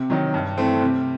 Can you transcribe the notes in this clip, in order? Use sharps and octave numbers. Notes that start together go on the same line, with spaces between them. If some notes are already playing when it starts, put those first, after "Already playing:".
Already playing: C3
D#3 F#3
G2
E3 A3 C4
C3